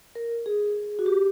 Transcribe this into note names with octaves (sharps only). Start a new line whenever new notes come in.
A#4
G#4
F#4
G4